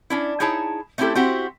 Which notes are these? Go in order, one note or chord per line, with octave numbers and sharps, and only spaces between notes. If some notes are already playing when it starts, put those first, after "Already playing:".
C#4 D4 E4
D#4 E4 G#4 C#5 A5
A3 C4 C#4 E4 G4 A4
C4 E4 F#4 G4 C5